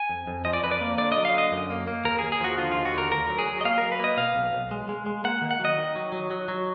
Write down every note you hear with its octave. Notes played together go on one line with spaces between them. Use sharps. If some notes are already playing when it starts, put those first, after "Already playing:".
Already playing: G#5
F2
F2
F3 D#5
D5
F2 B4
D5
A#3
D3 D5
F#3 D#5
F5
D3 D#5
F#2
A#3
A#3
D#2 A#4
D#2 G#4
G#4
F3 F#4
D3 F4
D#2 F4
F#4
D3 A#4
D2 A#4
F#3
G#4
F#3
D#5
A#3 F5
F#3 A#4
B4
A#3 D#5
B2 F5
B1
B1
G#3
G#3
G#3
A#3 F#5
D#3
F#5
F#3 D#5
D#3
F#3
F#3
F#3
F#3